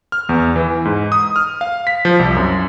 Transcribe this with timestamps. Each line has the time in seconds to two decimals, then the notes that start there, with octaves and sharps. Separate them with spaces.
0.12 F6
0.29 E2
0.56 E3
0.85 G#2
1.12 D#6
1.36 F6
1.61 F5
1.87 B6
2.05 F3
2.19 C2
2.36 F#2